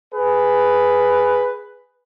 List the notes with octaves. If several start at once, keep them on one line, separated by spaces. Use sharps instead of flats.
G#4 B4